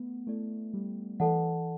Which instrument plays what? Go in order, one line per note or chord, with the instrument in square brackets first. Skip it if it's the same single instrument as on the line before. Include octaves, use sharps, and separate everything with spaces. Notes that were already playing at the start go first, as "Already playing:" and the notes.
Already playing: [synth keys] A3 B3
[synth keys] A3 [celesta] E4 A4 D5
[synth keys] G3
[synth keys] E3 [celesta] A4 D5 F#5 A5